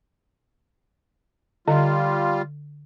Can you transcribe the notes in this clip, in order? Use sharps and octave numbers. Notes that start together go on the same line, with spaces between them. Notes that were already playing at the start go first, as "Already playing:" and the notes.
D3 G3 F4 D#5